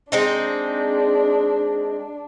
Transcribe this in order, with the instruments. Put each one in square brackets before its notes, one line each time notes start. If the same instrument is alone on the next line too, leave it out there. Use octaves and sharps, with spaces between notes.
[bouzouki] G#3 C4 D#4 [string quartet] D4